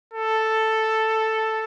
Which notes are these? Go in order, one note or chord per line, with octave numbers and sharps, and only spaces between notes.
A4